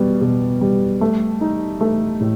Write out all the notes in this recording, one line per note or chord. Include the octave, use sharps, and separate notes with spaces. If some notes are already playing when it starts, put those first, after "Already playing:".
Already playing: B2 G3
B2
G3
A3
D#4
A3
A2